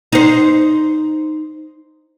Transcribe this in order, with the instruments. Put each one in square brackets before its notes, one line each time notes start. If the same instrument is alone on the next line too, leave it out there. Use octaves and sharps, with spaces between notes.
[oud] D#4 C5